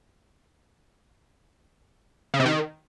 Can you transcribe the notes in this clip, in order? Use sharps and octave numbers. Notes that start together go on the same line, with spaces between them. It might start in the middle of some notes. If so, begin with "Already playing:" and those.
C#3
C3
D#3